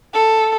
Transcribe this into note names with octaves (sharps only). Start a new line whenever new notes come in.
A4